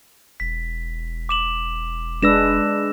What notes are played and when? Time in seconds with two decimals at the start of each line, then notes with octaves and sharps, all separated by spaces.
0.40 E1 B6
1.29 D6 E7 F#7
2.22 G#3 D4 B4 E6 A#6 E7